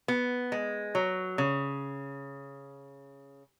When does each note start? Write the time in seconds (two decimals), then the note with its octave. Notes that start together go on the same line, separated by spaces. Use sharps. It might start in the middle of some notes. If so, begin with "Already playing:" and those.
0.08 B3
0.52 G#3
0.95 F#3
1.38 C#3